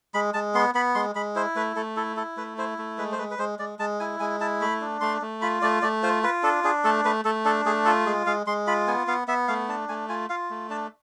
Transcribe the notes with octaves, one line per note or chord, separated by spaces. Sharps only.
G#3 B5
G#3 A5
B3 C6
B3 B5
G#3 C6
G#3 B5
E4 C5
A3 B4
A3 A4
E4 A4
E4 A4
A3 B4
E4 C5
A3
G#3 B4
C5
G#3 B4
B4
G#3 C5
G#3 D5
G#3 A5
E4 G#5
G#3 G#5
E4 A5
A3 B5
D4
A3 C6
A3
F4 B5
A3 D5
A3 D5
F4 C5
F4 B4
D4 A4
D4 G#4
A3 A4
A3 B4
A3 A4
D4 A4
A3 G#4
F4 A4
G#3 G#4
G#3 F5
G#3 C6
F4 B5
B3 G#5
B3 F5
B3 E5
A3 F5
D4 A5
A3 G#5
F4 G#5
F4 F5
A3
D4 A5